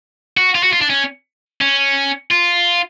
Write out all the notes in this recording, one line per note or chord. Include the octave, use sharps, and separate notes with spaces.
F#4
F4
F#4
F4
D4
C#4
C#4
F4